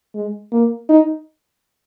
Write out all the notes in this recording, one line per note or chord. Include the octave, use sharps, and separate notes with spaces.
G#3
A#3
D#4